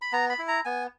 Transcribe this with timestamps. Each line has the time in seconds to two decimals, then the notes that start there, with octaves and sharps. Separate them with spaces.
0.02 B5
0.12 B3 A#5
0.30 B5
0.39 E4
0.48 A#5
0.65 B3 G#5